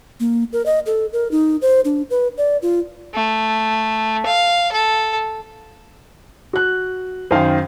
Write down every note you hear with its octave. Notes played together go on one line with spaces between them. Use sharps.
A#3
A#4
D#5
A4
A#4
D#4
C5
D4
B4
D5
F4
A3
F5
A4
F#4 F#6
F#2 D#3 C5 F5 G5